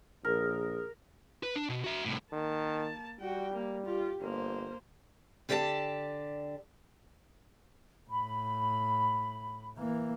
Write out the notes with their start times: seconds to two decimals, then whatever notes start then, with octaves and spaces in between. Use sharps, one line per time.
0.25 A#1 G#4 A#4
1.43 B4
1.56 D4
1.69 B2
1.84 F#4 E5
2.05 C2 A2
2.32 D#3 A#3 A5
3.20 G3 F#4 G5
3.54 A#3
3.86 F4 G4
4.21 G1 A#3 C5
5.49 D3 G4 D5 E5 A5
8.09 A2 B5
9.77 E3 A#3